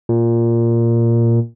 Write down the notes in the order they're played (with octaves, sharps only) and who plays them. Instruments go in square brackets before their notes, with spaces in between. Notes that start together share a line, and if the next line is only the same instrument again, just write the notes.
[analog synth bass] A#2